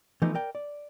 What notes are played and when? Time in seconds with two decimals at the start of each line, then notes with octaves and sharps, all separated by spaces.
0.22 E3 F3 A3 B3 D#4
0.35 A#4 D5 G5
0.55 D5